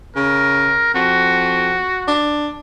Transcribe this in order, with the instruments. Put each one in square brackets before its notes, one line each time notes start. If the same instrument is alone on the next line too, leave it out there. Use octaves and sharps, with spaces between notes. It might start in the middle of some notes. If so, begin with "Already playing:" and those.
[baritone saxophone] C#3 [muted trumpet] A#4
[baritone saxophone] F2 [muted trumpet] F#4
[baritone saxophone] D4